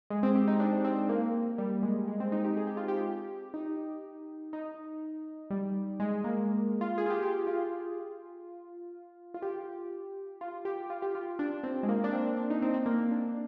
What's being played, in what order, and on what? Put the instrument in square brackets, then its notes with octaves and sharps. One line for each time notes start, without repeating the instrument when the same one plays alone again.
[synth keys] G#3
C4
G4
D#4
D4
C4
A#3
G3
G#3
G#3
C4
D#4
G4
G#4
G4
F4
G4
D#4
D#4
G3
G#3
A#3
F4
G#4
F4
G4
G4
F4
F4
G4
F4
G4
F4
G4
F4
D4
C4
G#3
A#3
D4
C4
D4
D#4
C4
C4
A#3
D4